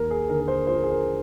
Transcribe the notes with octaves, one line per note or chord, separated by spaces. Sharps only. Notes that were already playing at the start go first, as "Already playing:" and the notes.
Already playing: D#2 A#4
G#4
D3 A#4
A#4
C5
F3 C5
A#4
G#4
A#4